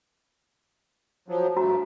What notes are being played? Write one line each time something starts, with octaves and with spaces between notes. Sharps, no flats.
F3 F#3
G2 A3 F#4 A#5